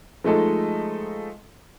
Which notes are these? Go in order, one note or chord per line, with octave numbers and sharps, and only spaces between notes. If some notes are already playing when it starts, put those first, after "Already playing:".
F3 G#3 A3 D#4 A4 D#5